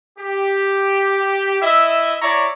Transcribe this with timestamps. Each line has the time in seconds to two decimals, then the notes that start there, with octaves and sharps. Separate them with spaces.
0.19 G4
1.61 E4 D#5 E5
2.21 E4 C#5 D5 A#5 C#6